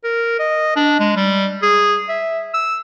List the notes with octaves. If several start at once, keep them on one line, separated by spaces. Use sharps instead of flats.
A#4
D#5
D4
G#3
G3
G#4
E5
E6